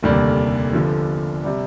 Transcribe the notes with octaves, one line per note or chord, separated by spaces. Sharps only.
F1 D#2 D3 G3 A#3
G1 G2 D3 F3
C3 G3